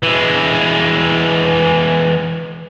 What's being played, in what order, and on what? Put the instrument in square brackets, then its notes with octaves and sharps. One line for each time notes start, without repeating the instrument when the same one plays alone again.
[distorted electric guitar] E3 G#3